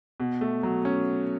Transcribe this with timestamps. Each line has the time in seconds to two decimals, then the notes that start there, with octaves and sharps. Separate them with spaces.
0.20 B2
0.41 A3
0.63 F#3
0.85 C#4